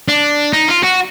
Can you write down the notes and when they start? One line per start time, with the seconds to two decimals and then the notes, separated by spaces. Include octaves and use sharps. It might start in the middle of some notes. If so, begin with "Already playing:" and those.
0.08 D4
0.53 D#4
0.68 F4
0.83 F#4